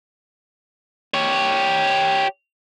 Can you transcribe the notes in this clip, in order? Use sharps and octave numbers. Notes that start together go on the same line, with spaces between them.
G4 C#5